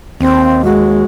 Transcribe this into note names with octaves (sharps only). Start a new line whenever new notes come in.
D#2 C4
G#3 F#4